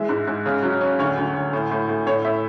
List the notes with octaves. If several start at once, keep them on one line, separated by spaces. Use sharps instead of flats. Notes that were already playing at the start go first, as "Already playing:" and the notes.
Already playing: E3 G#3 E5
G#2
G#2
C#3
F#3
C#4
D2 C#5
D2
D2
A2
A2
A2
A2 C#5
A2 E5